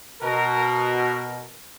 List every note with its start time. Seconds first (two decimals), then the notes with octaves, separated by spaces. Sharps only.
0.22 B2 A#4